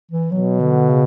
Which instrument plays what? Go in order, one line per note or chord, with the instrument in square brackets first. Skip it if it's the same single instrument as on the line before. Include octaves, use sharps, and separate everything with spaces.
[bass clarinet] E3
[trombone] B2 [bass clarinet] F#3
[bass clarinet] D3
C#3